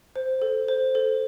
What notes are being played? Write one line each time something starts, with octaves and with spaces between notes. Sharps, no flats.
C5
A4
C5
A4